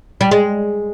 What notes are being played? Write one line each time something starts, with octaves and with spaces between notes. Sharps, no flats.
G3
G#3